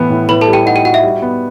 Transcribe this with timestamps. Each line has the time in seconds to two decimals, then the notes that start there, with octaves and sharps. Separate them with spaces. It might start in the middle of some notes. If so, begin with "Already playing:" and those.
Already playing: A2 E3 B3
0.10 A2
0.29 A2 B4 B5
0.41 A4 A5
0.48 G3
0.53 G4 G5
0.66 D#4 F#5
0.76 G4 G5
0.85 F#4 F#5
0.94 E5
1.03 G3
1.22 B3